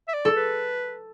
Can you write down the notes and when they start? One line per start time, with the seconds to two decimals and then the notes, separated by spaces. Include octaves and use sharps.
0.08 E5
0.14 D5
0.25 A4
0.37 B4